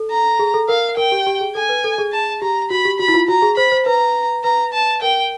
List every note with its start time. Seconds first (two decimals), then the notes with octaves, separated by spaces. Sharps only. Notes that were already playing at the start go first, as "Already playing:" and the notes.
Already playing: A4
0.11 A#5
0.39 G#4
0.54 A4
0.69 A#4 F5
0.97 A#4 G5
1.12 G4
1.26 G4
1.41 G#4
1.55 A4 G#5
1.69 B4
1.84 A4
1.98 G#4
2.12 A5
2.42 G4 A#5
2.70 F#4 B5
2.85 G4
2.99 F#4 B5
3.08 E4
3.14 F4
3.28 F#4 A#5
3.42 G#4
3.57 C5 B5
3.72 C5
3.86 B4 A#5
4.43 B4 A#5
4.73 A5
5.02 A#4 G5